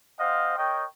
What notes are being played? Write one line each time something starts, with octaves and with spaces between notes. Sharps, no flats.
C4 C5 D#5 F5 F#5
A#4 C#5 D#5 G5